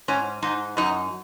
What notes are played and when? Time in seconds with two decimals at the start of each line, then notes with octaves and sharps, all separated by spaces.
0.08 G#2 C#4
0.42 G#2 D#4
0.77 F#2 D#4